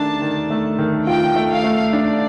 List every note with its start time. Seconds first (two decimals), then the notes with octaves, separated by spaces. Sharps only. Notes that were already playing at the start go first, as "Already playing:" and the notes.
Already playing: D#3 A3 D4 A5
0.22 D#3
0.50 A3
0.79 D#3
1.07 F4 G5
1.36 A3
1.50 F5
1.64 A3
1.93 D4 D5